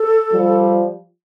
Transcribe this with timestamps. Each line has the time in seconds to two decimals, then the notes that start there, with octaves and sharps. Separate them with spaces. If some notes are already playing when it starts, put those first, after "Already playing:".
Already playing: A4
0.33 F3 G3